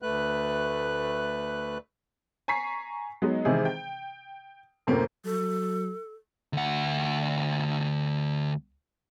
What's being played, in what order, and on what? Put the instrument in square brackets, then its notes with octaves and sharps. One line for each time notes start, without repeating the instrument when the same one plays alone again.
[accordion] D2 A3 B4 F#6
[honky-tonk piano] G#5 A#5 C#6 B6 C7
F#3 G#3 B3 D#4
C3 D#3 E3 G#3 E4 G#4
G5
F#2 A2 C3 A3 A#3
[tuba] F#3 [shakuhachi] A4
[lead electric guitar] D2 F#5